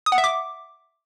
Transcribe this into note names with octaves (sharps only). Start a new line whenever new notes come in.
D#6
F#5
E5
D6